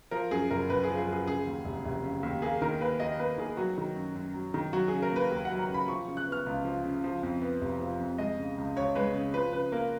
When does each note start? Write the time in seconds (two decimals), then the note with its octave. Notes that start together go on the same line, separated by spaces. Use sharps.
0.11 F3 A#4
0.31 F#2 G#4
0.50 F#1 A#4
0.69 F#1 B4
0.83 G#4
0.89 F3
0.98 G#4
1.08 F#2 G#4
1.27 C#3 G#4
1.47 D#2
1.65 F1
1.85 F1
2.04 C#3
2.23 D#2
2.42 A#3 G#4
2.62 D#3 A#4
2.81 D#2 B4
3.00 D#2 D#5
3.19 A#3 B4
3.38 D#3 G#4
3.57 F#3 F#4
3.78 D#3
3.96 F#2
4.16 F#2
4.34 F#3
4.54 D#3
4.73 F#3 F#4
4.88 C#3 G#4
5.02 A#4
5.12 A#3 B4
5.31 D#2
5.45 F#5
5.51 F#3
5.59 A#5
5.69 C#3
5.74 B5
5.88 F3 C#6
6.07 C#3
6.17 F#6
6.27 B3 F6
6.46 C#2
6.65 F3
6.85 C#3
7.04 F3
7.23 F2
7.42 B3
7.62 F1
7.80 F3
8.00 F2
8.18 G#3 D#5
8.39 C#3
8.58 C#2
8.76 C#2 C#5
8.95 G#3 B4
9.15 C#3
9.34 F3 B4
9.53 C#3 B4
9.72 A#3 A#4